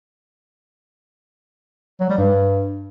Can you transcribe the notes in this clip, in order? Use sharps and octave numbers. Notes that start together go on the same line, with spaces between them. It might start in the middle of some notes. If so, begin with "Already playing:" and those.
F#3
G3
G2